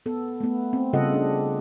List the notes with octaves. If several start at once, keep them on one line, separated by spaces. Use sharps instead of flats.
B3 A4
A3 B3
C4
C#3 G3 F4 A4 D#5 F#5
D4